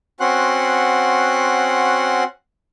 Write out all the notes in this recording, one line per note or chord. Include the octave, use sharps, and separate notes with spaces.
C4 C#4 F#4 F#5 C6 F#6